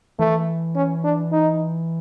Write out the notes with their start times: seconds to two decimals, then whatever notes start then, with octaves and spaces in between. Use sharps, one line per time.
0.19 E3 A3
0.75 C#4
1.04 D4
1.32 D#4